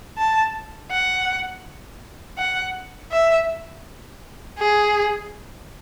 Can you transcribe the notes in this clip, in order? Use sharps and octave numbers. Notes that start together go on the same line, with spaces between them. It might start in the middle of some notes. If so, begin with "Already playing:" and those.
A5
F#5
F#5
E5
G#4